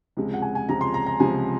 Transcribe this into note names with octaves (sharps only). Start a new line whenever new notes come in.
C#2 C3 F3 G#3
F#5
G#5
G#5
C#2 C3 F3 G#3 A#5
C6
A#5
A#5
C#2 C3 F3 G#3 G#5